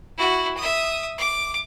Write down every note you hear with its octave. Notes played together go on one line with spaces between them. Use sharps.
E4 F#4
E5 D#6
D6